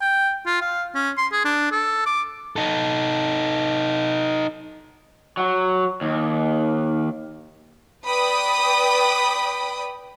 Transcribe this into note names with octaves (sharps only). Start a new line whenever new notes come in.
G5
F4
F5
C#4
C6
G#4
D4
A4
D6
D#4 A4
F#3
D#2
B4 D5 G5 B5 D#6